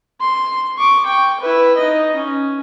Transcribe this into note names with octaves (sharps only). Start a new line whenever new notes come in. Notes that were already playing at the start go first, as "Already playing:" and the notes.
C6
C#6 D6
G5 C#6
E4 B4
D#4 D#5
C#4